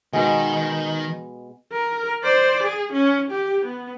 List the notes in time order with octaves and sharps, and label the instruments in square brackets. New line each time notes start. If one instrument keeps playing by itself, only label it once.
[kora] B2 G#3 B3 [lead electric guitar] D#3
[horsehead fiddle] A#4
C5 D5
G#4
C#4
G4
B3